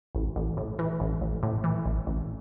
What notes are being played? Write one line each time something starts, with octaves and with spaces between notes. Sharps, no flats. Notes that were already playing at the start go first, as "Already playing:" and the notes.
A1
A1
A2
E3
A1
A1
A2
E3
A1
A1